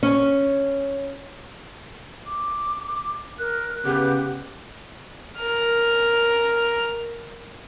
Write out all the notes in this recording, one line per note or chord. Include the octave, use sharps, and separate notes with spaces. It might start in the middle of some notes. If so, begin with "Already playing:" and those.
C#4
D6
A#4 F#6
C#3 B3 G4 F#5
A#4 F6